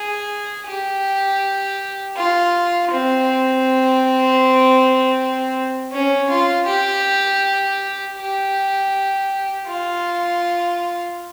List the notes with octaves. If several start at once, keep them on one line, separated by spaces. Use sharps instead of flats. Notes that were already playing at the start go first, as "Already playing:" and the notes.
Already playing: G#4
G4
F4
C4
C#4
F4
G4
G4
F4